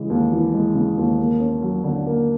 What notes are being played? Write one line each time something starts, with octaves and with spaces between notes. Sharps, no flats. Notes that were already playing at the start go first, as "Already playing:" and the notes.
Already playing: C#3 E3 G#3
D#2
E3
G#3
C#3
D#2
A#3
C#4
F#3
D3
A#3